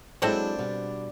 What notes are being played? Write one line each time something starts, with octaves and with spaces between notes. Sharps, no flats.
F#3 G#3 C4 D4 E4 A4 C5
B2 G3